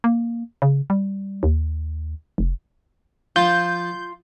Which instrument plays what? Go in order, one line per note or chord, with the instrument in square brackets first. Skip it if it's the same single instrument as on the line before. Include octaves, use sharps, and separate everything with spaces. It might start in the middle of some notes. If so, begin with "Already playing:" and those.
[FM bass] A#3
C#3
G3
D#2
F1
[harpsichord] F3 A5 [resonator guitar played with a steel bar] F4 [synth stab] G6